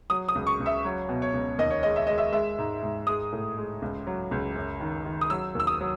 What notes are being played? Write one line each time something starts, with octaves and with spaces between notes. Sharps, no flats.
F#3 D#6
D#6
C#2
C#6
C#2
E5
F#3 C#5
B2
C#5
C#2
D#2 D#5
C#5
G#3 D#5
E5
G#3 D#5
E5
G#3 E5
G#2
G#2
G#3 D#6
A2
G#3
C#2
F#3
C#2
F#2
D#3
D#3
D#6
F#3 E6
D#2 E6
D#6
F#3